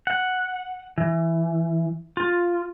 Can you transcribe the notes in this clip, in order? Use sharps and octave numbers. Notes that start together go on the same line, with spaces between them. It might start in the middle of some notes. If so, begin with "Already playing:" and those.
F#5
E3
F4